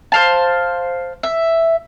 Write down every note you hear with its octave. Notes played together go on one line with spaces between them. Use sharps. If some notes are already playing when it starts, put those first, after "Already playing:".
C5 F5 A5
E5